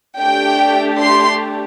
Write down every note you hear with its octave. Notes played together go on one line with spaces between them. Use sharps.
A3 D4 G4 G5
C6